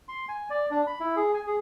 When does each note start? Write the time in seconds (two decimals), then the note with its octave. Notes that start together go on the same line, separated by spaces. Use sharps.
0.08 C6
0.28 G#5
0.50 D5
0.71 D4
0.87 B5
1.00 E4
1.16 G#4
1.34 G#5
1.47 G#4